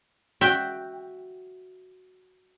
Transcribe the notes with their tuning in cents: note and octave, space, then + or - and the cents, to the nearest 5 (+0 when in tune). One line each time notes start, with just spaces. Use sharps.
F#4 +0 E5 +0 G5 +0